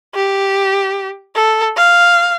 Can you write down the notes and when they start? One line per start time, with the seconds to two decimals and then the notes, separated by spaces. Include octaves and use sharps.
0.15 G4
1.36 A4
1.77 F5